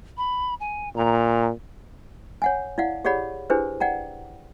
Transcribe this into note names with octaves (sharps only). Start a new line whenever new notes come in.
B5
G#5
A#2 A#5
C#5 F#5 G#5
E4 D5 F5 F#5
G4 G#4 C#5 D5 F#5 B5
D4 E4 G4 G#4 B4 C5
D5 F#5 G5 A#5